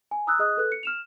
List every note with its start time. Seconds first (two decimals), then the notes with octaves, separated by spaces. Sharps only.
0.11 G#5
0.27 A#5 D#6 E6 F#6
0.39 G#4 D#5 D#6 F#6
0.57 A4 B4 F#6
0.72 C#7
0.83 F6 E7 F7